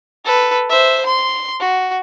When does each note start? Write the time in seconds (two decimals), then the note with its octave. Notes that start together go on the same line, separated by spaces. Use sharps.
0.25 A4 B4
0.70 C5 E5
1.06 C6
1.60 F#4